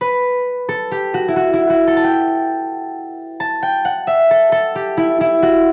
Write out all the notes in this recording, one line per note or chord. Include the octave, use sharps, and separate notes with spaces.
B4
A4
G4
F#4
E4
F#4
E4
F#4
A4
A5
G5
A5
G5
F#5
E5
A4
A4
G4
E4
E4
F#4